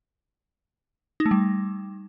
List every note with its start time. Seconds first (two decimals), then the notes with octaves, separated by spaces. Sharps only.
1.20 D#4
1.26 A3
1.31 G3